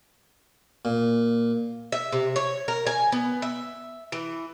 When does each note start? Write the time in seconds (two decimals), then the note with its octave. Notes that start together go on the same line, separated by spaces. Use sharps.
0.85 A#2
1.92 E5
2.12 C3
2.36 C#5
2.68 A#4
2.87 G#5
3.12 B3
3.42 E5
4.12 E3